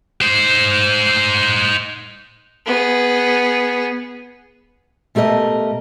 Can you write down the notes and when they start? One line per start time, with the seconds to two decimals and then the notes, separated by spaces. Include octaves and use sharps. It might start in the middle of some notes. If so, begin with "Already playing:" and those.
0.22 D#4 C5
2.66 B3 G#4
5.15 B2 A3 G4 A#4 D#5